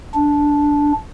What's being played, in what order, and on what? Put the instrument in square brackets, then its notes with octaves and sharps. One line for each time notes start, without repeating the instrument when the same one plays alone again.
[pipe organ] D4